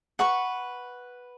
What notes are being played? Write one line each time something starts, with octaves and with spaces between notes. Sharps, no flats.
B4 F#5 C#6